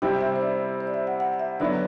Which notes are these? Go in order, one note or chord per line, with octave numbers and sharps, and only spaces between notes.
C3 G3 C4 E4 G5
E5
C5
D5
C5
D5
E5
F#5
F#5
E5
D3 F#3 B3 E4 D5